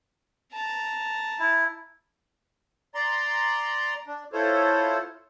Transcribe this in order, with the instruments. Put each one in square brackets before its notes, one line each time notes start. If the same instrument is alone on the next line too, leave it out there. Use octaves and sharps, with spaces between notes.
[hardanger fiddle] A5 A#5
[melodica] E4
[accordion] D5 A#5 C6
D4
E4 F4 A4 C5 C#5